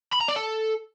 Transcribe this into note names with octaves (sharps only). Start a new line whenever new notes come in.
B5
A#5
D5
A4